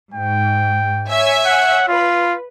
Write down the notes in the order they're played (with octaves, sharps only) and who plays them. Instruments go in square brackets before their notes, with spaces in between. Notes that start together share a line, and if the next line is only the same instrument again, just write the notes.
[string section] G#2 [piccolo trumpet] G5
[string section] C#5 E5 G#5
[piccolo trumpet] F#5
[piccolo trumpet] F4 [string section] B4